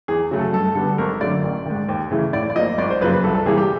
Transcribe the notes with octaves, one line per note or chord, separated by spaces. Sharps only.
E2 G#4
C#3 F#3 A3
A4
G2 A4
D3 G3 B3 A4
G#1 A#4
F#2 D3 F#3 A3 D5
A1
G#2 D#3
D#2
C#3 E3 A3
A2 D5
D5
F3 A#3 D#5
G#1 D5
C5
F#2 C#3 F3 A#3 B4
B4
C2 A4
A4
C3 E3 G3 A#3 G#4
G4